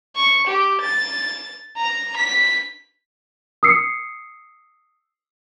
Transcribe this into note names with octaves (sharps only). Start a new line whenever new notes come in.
C#6
G4
A6
A#5
B6
D#6 E6 C7 C#7